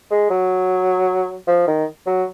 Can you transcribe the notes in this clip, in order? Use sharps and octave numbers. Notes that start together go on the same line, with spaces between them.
G#3
F#3
F3
D#3
F#3